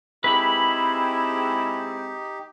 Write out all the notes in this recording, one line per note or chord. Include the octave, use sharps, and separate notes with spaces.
G#3 C4 D#4 E4 G4 B4 B5